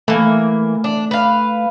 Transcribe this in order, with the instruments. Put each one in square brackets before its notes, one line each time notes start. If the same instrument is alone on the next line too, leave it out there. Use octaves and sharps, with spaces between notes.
[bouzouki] E3 A#3 [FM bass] A3
[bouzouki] D4
B4 F5